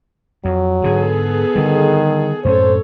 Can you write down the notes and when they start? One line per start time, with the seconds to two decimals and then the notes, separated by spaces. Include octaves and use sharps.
0.45 F2 F#3
0.84 G#2 D3 B3 G#4 A4
1.56 D3 D#3 G3
2.45 F#2 A2 C#4 A4 C5 C#5